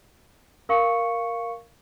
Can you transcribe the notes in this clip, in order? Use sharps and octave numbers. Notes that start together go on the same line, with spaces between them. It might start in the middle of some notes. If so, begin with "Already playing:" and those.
A#4 F5 C#6 C#7